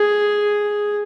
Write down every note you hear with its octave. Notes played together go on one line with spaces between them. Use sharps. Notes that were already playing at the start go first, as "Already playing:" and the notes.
Already playing: G#4